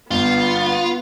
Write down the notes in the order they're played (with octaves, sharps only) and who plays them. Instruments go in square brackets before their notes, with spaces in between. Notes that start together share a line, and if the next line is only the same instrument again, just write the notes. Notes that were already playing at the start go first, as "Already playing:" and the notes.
[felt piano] G1 [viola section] B3 [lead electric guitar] F4